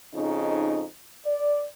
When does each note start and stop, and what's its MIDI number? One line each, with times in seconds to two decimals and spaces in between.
0.14 0.83 41
0.14 0.83 49
0.14 0.83 63
1.24 1.62 74